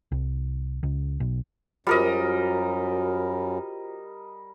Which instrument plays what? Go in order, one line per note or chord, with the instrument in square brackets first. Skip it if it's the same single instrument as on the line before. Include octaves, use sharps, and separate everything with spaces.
[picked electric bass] C2
C#2
B1
[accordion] F#2 [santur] G3 A#4 D#5 [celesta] F4 F#4 C5